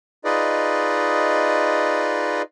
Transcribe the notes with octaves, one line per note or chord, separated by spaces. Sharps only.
D#4 F4 G#4 B4 D5 D#5